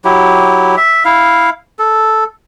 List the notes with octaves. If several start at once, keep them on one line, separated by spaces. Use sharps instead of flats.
F#3 E4 G4
E5
E4 F5
A4